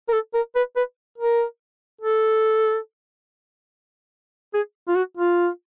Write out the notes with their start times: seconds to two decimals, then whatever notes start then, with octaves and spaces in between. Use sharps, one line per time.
0.09 A#4
0.13 A4
0.34 A#4
0.56 B4
0.76 B4
1.18 A#4
2.01 A4
4.54 G#4
4.88 F4
4.96 F#4
5.17 F4